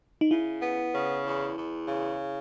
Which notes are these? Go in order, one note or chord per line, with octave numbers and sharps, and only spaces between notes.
D#4
C#3 E4
B3
C#3
E2
E2
C#3